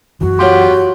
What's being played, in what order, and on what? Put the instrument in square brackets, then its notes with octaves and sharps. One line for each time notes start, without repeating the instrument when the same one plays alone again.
[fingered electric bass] F#2 E3 [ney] F#4
[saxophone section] B3 F4 G4 [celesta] C#5 F#5 C6